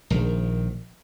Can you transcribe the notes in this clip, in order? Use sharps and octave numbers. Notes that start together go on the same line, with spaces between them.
A#1 D#3